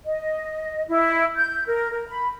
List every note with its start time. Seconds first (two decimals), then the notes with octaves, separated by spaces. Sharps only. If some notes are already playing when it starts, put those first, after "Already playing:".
0.05 D#5
0.89 E4
1.37 G6
1.67 A#4
1.92 A#4
2.08 B5